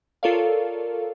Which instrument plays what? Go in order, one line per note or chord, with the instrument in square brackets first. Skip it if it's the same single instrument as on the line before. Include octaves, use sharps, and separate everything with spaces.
[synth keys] F4 A4 A#4 C#5 D5 F5